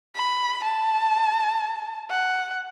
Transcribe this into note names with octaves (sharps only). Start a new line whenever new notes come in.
B5
A5
F#5